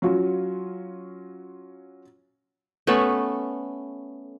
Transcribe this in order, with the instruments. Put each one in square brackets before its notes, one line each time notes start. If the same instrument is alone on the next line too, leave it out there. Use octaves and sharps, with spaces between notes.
[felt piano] F#3 C#4 F4 F#4
[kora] A3 B3 C#4 A4